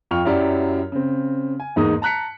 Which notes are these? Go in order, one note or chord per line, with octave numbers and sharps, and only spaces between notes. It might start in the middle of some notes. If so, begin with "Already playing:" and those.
F2 F4 G5 C#6 F6 F7
F#2 F#3 E4 G4 D5
C#3 C4
G#5
E2 G#2 G#3 A#3 D#4 D#6
A5 A#5 F#6 B6 C#7